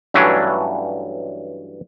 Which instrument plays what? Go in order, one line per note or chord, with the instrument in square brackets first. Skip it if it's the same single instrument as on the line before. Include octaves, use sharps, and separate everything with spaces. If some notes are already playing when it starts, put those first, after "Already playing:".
[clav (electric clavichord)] G2 E3 F#3 A3 C#4 D4